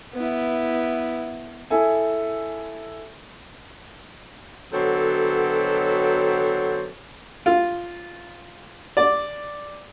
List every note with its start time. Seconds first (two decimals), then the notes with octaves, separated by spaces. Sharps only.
0.14 B3 E4
1.70 E4 G#4 A4 G#5
4.71 B2 D3 F#3 C4 A4 C#5
7.46 F4
8.97 D5